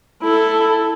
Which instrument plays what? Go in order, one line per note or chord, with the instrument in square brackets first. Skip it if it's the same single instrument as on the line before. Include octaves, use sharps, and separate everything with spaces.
[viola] E4 A4